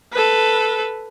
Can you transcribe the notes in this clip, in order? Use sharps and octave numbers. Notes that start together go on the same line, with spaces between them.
A4 B4